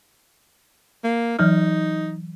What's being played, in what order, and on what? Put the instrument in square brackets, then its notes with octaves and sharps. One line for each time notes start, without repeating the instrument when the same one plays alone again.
[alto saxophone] A#3
[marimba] E3 F#3 F6 [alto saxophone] D#4